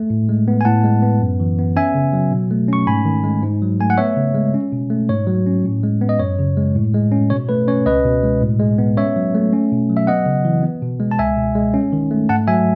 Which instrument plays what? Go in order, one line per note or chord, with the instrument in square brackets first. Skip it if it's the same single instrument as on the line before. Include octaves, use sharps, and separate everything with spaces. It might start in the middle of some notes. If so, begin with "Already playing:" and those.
Already playing: [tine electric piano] A3
A2
G#3
B3
G#5
A2 F#5 A5
G#3
B3
F#2
E3
B3
C#4 E5 G#5
C#3
F#3
B2
A3
C#4 C#6
G#2 G#5 B5
D#3
G#3
G#2
F#3
A3 G#5
F#5
B3 C#5 E5
C#3
G#3
C#4
B2
A3
G#2 C#5
F#3
C#4
A2
G#3
B3
D#5
F#2 C#5
C#3
G#3
A2
G#3
C#4
B2 C#5
A3 B4
C#4 C#5
C#2 B4 D#5
B2
G#3
A2
G#3
B3
C#4 C#5 E5
F#3
A3
C#4
B2
F#3
E5
B3 D#5 F#5
C#3
E3
B3
B2
G#3
A5
C#2 E5 G#5
B2
G#3
C#4
D#3
A3
G#2 F#5 A5
F#3 E5 G#5